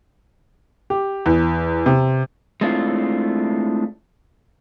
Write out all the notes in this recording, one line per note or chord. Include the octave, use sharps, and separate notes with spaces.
G4
E2
C3
G#3 A3 C4 D4 E4 F4